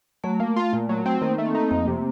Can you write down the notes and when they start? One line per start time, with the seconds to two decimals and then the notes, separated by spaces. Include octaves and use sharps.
0.24 F#3 A3
0.40 A#3
0.56 F4
0.73 A#2
0.89 F#3
1.06 C4
1.22 D#3 A#3
1.38 A3
1.46 C4
1.55 D#4
1.71 F2 A#3
1.87 C3